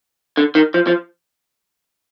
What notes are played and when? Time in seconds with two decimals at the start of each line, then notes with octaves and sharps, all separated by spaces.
0.37 D3
0.55 D#3
0.74 F3
0.87 F3